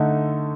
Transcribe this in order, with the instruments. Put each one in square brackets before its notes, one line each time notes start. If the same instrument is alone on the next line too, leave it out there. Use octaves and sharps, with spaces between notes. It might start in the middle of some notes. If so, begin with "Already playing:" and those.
Already playing: [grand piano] D3 A3 D#4